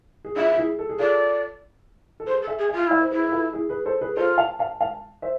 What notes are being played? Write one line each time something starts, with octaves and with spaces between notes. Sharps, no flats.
G#4
D4 F4 E5
F4
E4 G#4
A4
G#4
F4 A4 D5
A4
G#4 B4 C5
A4
E5 G#5
G#4
E5 G#5
F4
E4 D5 F5
C5
E4 G#4 B4
B4
F4 A4
E4 G#4
G#4 B4
A4 C5
G#4 B4
F4 A4 C5
F5 A5
F5 A5
F5 A5
C5 E5